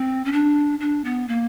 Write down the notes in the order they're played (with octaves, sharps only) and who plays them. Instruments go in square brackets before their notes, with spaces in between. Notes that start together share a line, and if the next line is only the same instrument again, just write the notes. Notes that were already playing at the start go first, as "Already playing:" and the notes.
Already playing: [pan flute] C4
C#4
D4
D4
B3
A#3